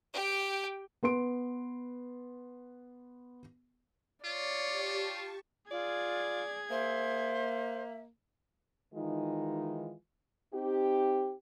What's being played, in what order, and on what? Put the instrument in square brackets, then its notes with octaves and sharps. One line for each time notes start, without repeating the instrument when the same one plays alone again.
[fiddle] G4 G5
[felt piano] B3 B4 C6 D7
[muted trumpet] F4 [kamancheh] C#5 D5
[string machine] G4 A5 C#6
[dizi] F4 [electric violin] G#4 G#6 [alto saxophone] D5
[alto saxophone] A#3 [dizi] C5 [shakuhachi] E5
[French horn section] D#3 E3 G#3 D#4 F4
C4 D#4 G4